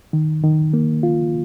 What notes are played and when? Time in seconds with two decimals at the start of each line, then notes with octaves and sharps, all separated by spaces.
0.13 D#3
0.43 D#3
0.73 A#3
1.03 F4